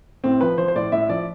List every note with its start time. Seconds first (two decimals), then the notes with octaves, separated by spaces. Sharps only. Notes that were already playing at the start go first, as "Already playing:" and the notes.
0.24 A2 C4
0.41 F3 B4
0.58 F3 C5
0.68 C5
0.75 A2 D5
0.92 A2 E5
1.09 F3 D5